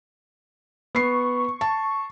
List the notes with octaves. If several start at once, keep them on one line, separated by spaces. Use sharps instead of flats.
B3 C#6 C7
A5